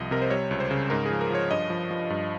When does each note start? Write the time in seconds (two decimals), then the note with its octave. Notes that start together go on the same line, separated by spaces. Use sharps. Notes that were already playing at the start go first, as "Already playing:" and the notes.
Already playing: C2 F3 D#5
0.11 C3 A#4
0.22 C5
0.30 G3 C#5
0.51 C#2
0.60 C5
0.71 C#3
0.90 G#2 A#4
1.06 F3 G#4
1.21 A#4
1.30 F3 C#5
1.51 G2 D#5
1.70 F3
1.91 F3
2.10 G2